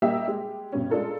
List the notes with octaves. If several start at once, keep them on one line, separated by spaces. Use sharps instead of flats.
G3 A#3 G4 D#5 E5
G#3 G4
G2 B2 C#4
G#3 D4 F4 A4 A#4